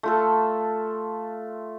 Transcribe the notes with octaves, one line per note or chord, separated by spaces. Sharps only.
A3 F4 A4